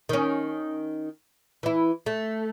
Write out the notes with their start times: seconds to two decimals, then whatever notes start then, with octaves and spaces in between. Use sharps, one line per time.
0.09 D#3 C#4
1.63 E3 E4
2.06 A3